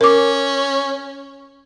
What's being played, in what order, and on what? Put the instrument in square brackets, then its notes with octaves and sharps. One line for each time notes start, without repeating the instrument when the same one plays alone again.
[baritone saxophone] C#4 [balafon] A#4 D6